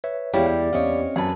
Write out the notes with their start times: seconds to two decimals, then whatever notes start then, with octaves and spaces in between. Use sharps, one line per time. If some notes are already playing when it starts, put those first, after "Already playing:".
0.04 B4 C#5 E5
0.34 E2 G3 G#3 E4 G4 C#5 F5 G5
0.46 G5
0.73 C4 C#4 C#5 D#5 F5
1.16 F#2 G#4 B4 A5